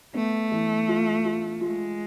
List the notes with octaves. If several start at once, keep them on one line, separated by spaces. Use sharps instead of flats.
A3 B3
E3
F4
F4
G#3 F4